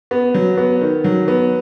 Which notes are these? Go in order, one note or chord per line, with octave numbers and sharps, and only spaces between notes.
B3
F#3
B3
D#3
F#3
B3